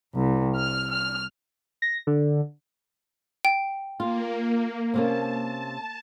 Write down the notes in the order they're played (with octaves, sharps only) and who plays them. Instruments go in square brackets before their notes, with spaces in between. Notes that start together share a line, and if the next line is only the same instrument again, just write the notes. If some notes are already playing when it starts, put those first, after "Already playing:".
[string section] C2
F6
F6
[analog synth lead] A#6
D3
[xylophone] G5
[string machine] A#3 [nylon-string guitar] F4
[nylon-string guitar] C3 A#3 C#4 [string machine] A5